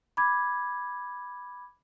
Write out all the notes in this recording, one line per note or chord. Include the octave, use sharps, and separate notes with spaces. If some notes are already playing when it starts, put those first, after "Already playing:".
B5 D6 G#6